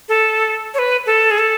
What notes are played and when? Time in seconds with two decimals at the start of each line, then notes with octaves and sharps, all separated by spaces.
0.09 A4
0.74 C#5
0.79 B4
1.06 A4
1.31 G#4
1.38 A4